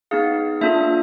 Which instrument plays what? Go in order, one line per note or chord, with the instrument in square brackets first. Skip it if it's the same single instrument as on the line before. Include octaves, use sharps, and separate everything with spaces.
[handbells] B3 D#4 G#4 F5
A#3 D4 F4 A4 E5